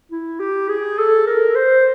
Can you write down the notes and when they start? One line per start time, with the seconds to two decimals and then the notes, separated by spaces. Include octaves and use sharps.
0.11 E4
0.40 G4
0.68 G#4
0.98 A4
1.27 A#4
1.55 C5